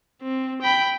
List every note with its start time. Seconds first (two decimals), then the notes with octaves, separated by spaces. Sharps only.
0.22 C4
0.62 G5 B5